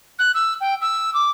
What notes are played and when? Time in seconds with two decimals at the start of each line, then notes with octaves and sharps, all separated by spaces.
0.19 F#6
0.34 E6
0.61 G5
0.81 E6
1.14 D6